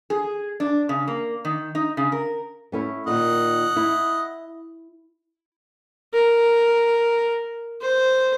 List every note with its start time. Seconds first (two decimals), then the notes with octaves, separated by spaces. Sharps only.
0.10 G#4
0.60 D4
0.89 C#3
1.08 A#3
1.45 D#3
1.75 D#4
1.97 C#3
2.12 A#4
2.72 A3 C#4 E4
3.07 A#2 D#3 D#5 F#5
3.76 E4
6.14 A#4
7.81 C5